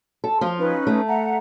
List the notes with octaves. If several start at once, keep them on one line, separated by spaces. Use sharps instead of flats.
A4
F3 F4
C#4 D#4 B4
A3
E5 F#5 A#5